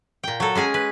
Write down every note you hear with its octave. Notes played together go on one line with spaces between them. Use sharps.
A#2 G5
F#3 A4
G#3 C#4 G#4 G#5
B4